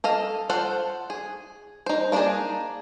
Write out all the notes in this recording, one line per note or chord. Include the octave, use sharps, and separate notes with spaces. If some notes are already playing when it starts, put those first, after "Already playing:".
A4 D#5 F5
F4 A4 C5 F#5
G#4
D#4 C5
A#3 B3 D4 D#4 G#4